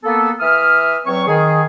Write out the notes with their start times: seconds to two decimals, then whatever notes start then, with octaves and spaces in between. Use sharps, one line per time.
0.04 A#3 B3 A4
0.40 E3 E5 D#6 F6
1.05 E2 F#3 C4 C#5 C#6
1.27 D#3 G#4